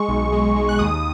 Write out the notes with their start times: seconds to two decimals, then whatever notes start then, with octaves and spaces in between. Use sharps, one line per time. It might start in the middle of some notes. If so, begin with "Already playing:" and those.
Already playing: G#3 C#6
0.08 B1
0.33 G#3
0.56 G#3
0.69 F#6
0.79 D#2 D#6